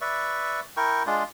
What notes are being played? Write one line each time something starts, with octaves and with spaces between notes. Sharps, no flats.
B4 D5 E5 C#6
E4 A#4 G5 C#6
G#3 D4 F4 G#4